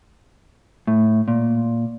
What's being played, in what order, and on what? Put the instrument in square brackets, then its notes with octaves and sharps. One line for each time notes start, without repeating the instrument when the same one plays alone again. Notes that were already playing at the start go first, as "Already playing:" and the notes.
[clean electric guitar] A2
A#2